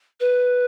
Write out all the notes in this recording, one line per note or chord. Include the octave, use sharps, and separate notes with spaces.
B4